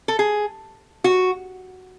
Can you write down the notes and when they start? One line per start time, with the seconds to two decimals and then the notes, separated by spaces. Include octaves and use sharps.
0.08 A4
0.19 G#4
1.04 F#4